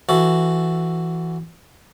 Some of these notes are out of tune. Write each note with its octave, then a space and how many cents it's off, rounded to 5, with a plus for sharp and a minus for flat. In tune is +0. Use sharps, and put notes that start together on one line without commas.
E3 +10 F#4 +0 A4 +0